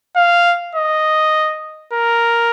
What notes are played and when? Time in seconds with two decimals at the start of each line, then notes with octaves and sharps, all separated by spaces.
0.16 F5
0.75 D#5
1.93 A#4